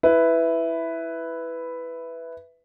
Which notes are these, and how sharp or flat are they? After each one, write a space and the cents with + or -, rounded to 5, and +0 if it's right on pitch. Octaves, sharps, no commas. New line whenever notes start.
E4 +0 B4 +5